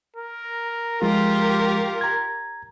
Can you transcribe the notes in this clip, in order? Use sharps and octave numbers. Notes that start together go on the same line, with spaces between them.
A#4
F3 G#3 F4 G4 A#4
A#5 G#6